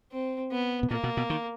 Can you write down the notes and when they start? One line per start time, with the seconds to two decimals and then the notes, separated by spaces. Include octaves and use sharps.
0.12 C4
0.52 B3
0.83 B2
0.91 A#2 A#3
1.03 B2
1.17 B2
1.30 D#3